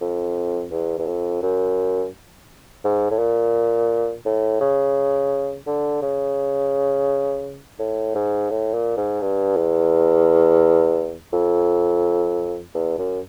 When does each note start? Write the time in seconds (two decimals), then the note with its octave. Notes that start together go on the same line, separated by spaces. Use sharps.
0.01 F2
0.71 E2
0.99 E2
1.07 F2
1.43 F#2
2.84 G#2
3.11 A2
3.19 A#2
4.25 A2
4.61 C#3
5.67 D3
6.02 C#3
7.79 A2
8.15 G#2
8.50 A2
8.74 A#2
8.97 G#2
9.21 G2
9.56 E2
11.33 F2
12.74 E2
12.98 F#2